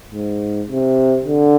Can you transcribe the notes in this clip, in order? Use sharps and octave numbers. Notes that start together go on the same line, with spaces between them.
G#2
C3
D3